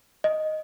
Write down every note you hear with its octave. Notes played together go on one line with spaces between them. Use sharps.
D#5